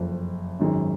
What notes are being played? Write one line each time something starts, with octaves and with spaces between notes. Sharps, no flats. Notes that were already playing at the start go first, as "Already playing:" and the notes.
Already playing: F#1 F2 F3
G#1 F#2 D#3 G#3